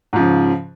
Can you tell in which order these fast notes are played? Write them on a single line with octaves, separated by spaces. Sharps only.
G#2 F3 C#3